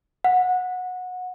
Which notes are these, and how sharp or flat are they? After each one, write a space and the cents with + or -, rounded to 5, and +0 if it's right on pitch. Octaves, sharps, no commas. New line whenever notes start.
F#5 -20